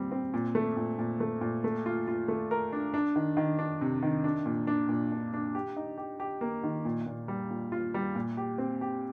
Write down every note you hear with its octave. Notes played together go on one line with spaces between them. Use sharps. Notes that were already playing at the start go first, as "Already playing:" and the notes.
Already playing: A#2 G3 C4
C4
A#2
A3
A#2
A#2
A3
A#2
A3
F4
F4
A3
A#4
D4
D4
D#3
D#3
D4
C3
D#3
D4
A#2
D4
A#2
D4
D4
G4
D#4
G4
G4
A#3
D#3
A#2
A#2
G3
A#2
F4
G3
A#2
G4
C4
G4